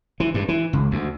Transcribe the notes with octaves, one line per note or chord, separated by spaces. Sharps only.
E3
G2
E3
C#2
D2